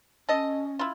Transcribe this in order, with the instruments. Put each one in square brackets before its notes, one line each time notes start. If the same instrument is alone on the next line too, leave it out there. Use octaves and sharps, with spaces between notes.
[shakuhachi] C#4 [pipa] A4 D#5
[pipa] E4 F4